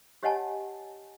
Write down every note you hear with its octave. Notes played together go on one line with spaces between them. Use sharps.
G4 C#5 D#5 F#5 G#5 A5